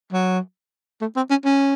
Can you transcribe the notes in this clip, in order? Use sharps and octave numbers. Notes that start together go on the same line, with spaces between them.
F#3
A3
C4
C#4
C#4